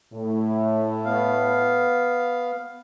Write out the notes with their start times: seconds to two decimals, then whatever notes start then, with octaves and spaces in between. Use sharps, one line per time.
0.14 A2
1.05 B3 F5